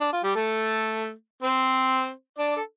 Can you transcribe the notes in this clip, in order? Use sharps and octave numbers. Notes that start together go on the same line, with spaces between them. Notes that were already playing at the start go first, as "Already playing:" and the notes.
D4
F4
G3 G4
A3 A4
C4 C5
D4 D5
A4